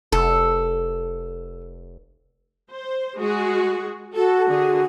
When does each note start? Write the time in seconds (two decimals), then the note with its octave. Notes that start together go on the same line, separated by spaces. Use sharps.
0.12 F1 A4
2.70 C5
3.17 G#3 F#4 G#4
4.16 F#4 A4
4.47 D3 G#4